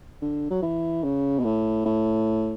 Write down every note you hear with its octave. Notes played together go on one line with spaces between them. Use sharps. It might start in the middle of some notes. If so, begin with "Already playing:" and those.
D3
F#3
E3
C#3
B2
A2
A2